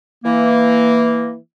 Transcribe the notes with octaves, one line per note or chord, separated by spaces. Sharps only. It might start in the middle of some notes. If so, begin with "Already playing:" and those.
E3 A#3